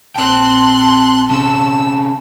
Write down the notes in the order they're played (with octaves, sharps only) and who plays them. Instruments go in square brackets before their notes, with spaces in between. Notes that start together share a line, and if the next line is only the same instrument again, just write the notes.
[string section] A#1 C6 F#6 [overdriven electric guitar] C4 G5 [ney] A5
[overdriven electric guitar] C3 C#4 [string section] E6